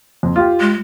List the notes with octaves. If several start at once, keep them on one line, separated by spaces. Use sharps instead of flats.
F2
F4 G4
G#3